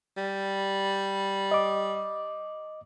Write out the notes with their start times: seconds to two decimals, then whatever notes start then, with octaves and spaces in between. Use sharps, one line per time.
0.17 G3
1.51 D#5 D6